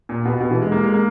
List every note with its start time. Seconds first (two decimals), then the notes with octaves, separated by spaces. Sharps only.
0.09 A#2
0.25 B2
0.41 B2
0.51 E3
0.62 G#3
0.72 A#3
0.83 G#3
0.94 A#3